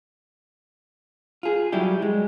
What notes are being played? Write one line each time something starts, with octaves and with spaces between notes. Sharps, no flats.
F4 G#4
F#3 G3 E4 G4
G#3